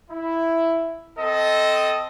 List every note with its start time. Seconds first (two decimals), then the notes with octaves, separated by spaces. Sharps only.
0.10 E4
1.18 C4 A4 D#5